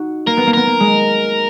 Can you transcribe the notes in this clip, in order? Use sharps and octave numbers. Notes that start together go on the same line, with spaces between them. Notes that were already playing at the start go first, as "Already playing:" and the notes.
Already playing: D#4 F#4
A#3 A#4
B3
A#3
B3 A#4
A#3
G#3